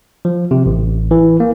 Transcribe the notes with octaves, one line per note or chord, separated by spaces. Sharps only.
F3
C3
A1
E3
A#3